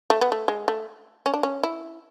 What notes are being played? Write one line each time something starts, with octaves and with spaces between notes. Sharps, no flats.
A3
B3
A3
G#3
A3
C#4
D4
C#4
E4